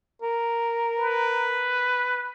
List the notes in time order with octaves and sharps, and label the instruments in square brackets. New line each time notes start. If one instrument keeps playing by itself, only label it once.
[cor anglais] A#4
[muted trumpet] B4